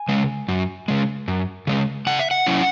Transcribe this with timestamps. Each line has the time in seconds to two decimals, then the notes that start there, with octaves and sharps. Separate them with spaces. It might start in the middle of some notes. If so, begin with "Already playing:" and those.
Already playing: G#5
0.09 C#3 G#3
0.48 F#2
0.88 C#3 G#3
1.28 F#2
1.67 C#3 G#3
2.07 C#3 F#5
2.19 E5
2.31 F#5
2.46 F#3 C#4 E4